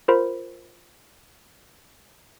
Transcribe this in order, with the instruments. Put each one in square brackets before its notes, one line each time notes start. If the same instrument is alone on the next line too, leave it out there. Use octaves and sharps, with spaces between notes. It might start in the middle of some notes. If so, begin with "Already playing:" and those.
[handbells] F4 A#4 C5 B5